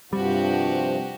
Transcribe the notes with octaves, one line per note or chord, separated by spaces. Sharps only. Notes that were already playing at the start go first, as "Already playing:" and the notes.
G2 C3 F3 G3 F#4 G4